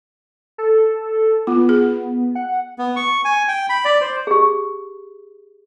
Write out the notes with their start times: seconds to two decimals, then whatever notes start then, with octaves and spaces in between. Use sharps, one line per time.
0.58 A4
1.47 B3 F4
1.69 G#4
2.35 F#5
2.79 B3
2.96 C#6
3.25 G#5
3.48 G5
3.69 B5
3.85 D5
4.01 C5
4.27 G4 G#4